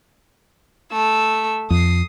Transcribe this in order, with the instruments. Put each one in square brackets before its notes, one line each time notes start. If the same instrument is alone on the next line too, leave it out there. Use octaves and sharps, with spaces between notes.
[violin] A3 E6
[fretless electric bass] F2 [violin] D#6 C7